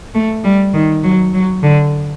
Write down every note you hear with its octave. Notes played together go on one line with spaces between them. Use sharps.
A3
G3
D#3
F#3
F#3
D3